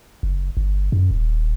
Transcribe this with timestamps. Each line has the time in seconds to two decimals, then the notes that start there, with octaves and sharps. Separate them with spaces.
0.23 F#1
0.57 G1
0.92 F#2
1.11 D#1